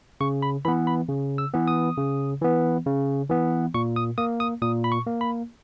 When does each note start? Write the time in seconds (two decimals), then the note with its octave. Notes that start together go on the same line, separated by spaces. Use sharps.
0.21 C#3 C#6
0.42 B5
0.65 E3 B3 B5
0.87 B5
1.09 C#3
1.38 E6
1.53 E3 B3
1.68 D#6
1.98 C#3
2.41 E3 B3
2.86 C#3
3.30 E3 B3
3.74 A#2 C#6
3.96 D#6
4.18 A#3 D#6
4.40 D#6
4.62 A#2 D#6
4.84 B5
4.92 C#6
5.06 A#3
5.21 B5